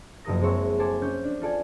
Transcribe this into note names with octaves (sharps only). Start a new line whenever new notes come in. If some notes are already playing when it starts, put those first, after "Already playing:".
F#1 F#2 F3 A#4 D#6 A#6
G#3 C4 C5 C#5 E5 F#5
A4 C5 G#5 D6
C#4 G6
D4
F4 A4 D5 G#5